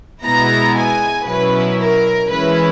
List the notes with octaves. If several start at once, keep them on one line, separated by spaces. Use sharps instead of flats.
B2 G#3 B3 E4 A#5
G#5
B2 F#3 C#4 E4 B4
A#4
E3 G#3 C#4 E4 B4